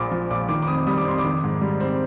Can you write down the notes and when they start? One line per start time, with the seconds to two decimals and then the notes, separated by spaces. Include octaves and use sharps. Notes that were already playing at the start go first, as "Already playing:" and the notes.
Already playing: A#1 A#2 C6 D6
0.11 F3
0.31 A#1 D6
0.49 D#3 D6
0.62 D6
0.67 F2 D#6
0.87 G3 D#6
0.98 D6
1.05 F2 C6
1.18 D6
1.24 D#3
1.43 G#2
1.61 G3
1.80 C4